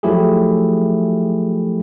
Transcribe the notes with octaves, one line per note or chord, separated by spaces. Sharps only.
F3 F#3 A3 E4 G4 G#4